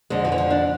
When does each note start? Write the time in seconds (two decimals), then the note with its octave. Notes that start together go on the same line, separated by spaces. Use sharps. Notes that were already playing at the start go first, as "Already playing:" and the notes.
0.10 F2 D3 G#3
0.25 F3
0.32 E3
0.38 F3
0.50 D4